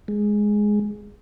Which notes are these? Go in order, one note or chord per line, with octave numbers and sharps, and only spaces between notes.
G#3